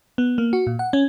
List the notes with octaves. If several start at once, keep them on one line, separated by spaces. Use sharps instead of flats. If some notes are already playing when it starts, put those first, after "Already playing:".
B3
A#3
F#4
A#2
F#5
C#4